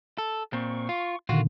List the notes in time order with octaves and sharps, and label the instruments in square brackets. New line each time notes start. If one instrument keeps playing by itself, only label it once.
[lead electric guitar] A4
[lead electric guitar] A#2 C4 [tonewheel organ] C#6
[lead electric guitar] F4
[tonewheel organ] A#2 D3 D#3 [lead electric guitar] F4 F#4